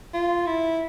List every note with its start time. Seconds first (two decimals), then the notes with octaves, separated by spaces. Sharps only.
0.14 F4
0.47 E4